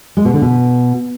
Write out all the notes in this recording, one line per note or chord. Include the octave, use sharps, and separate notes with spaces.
G#3
B2
D3
B2